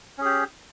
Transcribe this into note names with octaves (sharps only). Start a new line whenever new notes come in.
C#4 G4 G#4